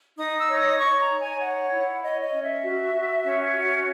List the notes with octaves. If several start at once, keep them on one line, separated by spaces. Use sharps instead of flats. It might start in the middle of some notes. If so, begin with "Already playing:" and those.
D#4 D#6
E6
C#5
D#6
C#5 C#6
A#5
D#4
G#5
C#5 F#5
E4
C#5 D#5
D#5
C#4
E5
F#4
F#4
C#4
F#4